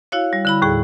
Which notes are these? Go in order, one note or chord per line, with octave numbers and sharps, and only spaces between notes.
E4 F#4 C#5 F5
G3
D3 E4 B5
D#2 A2 G#4